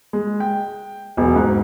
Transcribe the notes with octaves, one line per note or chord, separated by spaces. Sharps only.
G#3
G5
E1 B1
G#2